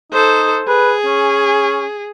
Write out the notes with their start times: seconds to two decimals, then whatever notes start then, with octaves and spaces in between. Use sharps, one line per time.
0.12 D#4 A4 C5
0.68 G#4 B4
1.06 C#4